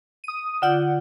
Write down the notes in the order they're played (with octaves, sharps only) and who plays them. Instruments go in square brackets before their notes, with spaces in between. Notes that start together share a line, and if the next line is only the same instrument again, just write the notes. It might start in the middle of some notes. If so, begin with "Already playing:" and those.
[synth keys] D#6 D#7
[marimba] D3 F4 G6 [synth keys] D5 F#5